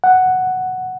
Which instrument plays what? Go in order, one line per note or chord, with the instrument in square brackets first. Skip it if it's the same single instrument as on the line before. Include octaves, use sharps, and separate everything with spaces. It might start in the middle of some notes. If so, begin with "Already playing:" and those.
[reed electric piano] F#5